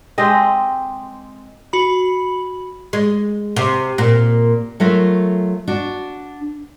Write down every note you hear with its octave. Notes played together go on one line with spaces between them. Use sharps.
G#3 C4 G4 D#5
F#4 B5
G#3
C3
A#2
F#3 A3 F4 A4 A#4 E5
D4 F#4